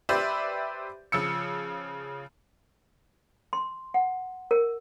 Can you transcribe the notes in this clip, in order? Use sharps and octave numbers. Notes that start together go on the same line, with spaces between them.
G4 B4 C5 D5 E5
C#3 F3 E6 C#7
C6
F#5
A#4